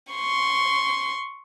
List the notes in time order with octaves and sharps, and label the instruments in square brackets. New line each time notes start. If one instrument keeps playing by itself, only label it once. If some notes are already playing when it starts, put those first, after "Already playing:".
[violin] C6 C#6